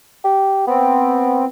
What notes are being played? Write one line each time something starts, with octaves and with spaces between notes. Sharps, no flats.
G4
B3 C4